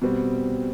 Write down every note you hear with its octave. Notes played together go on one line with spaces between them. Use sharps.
B2 G3 C4